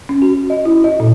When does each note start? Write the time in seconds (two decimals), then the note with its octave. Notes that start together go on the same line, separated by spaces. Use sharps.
0.09 C#4
0.22 F#4
0.50 D#5
0.65 E4
0.84 D#5
1.00 A#2